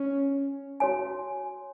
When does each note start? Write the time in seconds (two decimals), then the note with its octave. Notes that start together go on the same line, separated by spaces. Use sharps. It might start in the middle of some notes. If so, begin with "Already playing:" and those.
Already playing: C#4
0.80 F#4 C#5 G#5